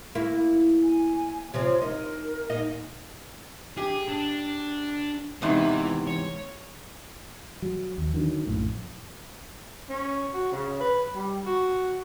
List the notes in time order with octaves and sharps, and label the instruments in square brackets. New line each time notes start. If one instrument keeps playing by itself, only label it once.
[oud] A#3 E4
[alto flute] G#5
[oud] C3 F3 C4 [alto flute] C#5
[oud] D#4 [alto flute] A#4
[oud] A#2 D#4 D#5
[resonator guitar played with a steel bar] G4 [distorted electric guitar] G#4
[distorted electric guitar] D4
[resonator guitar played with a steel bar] E2 G#2 C3 [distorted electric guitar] E3
[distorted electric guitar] C#5
[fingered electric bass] F#3
D#2
D3 D#3 F#3
A#1 F#2 A2
[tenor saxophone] C#4
F#4
C#3
B4
G3
F#4